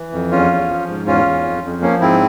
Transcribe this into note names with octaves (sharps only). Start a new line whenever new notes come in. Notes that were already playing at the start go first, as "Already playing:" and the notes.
Already playing: E3
F2
E2 C#4 F4
E2
F3
G#2
E2 C#4 F4
E2
F2
F2
F3 A#3 C#4
G#2 C4 E4